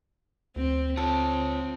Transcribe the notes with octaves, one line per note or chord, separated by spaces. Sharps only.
D2 C4
C4 F4 A4 C#5